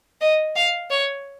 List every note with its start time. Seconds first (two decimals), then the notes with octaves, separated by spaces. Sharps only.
0.21 D#5
0.56 F5
0.91 C#5